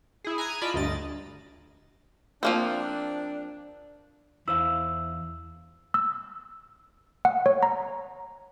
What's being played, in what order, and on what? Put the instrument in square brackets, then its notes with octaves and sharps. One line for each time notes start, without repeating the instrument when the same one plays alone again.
[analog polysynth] E4 G#4
G#5 A#5 F#6 G#6
F4 D5 D#5 A5 B5
D2 G2 D#5 A6
[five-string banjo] F3 A#3 C4 [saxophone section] D4
[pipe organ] E2 [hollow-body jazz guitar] E4 C5 F5 [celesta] E6
[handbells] E6
F#5
C#5
A#5